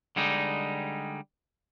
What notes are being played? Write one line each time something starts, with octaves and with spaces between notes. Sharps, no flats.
D3 G3 G#3 D#4